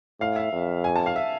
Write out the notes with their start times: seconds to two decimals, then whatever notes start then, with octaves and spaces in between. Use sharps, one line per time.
0.20 A2 F5
0.36 E5
0.53 F2
0.84 G#5
0.96 A5
1.06 F5
1.16 E5